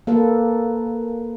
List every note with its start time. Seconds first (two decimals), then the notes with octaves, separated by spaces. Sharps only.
0.07 A#3 A4 B4